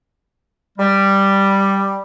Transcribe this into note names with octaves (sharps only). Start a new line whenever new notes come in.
G3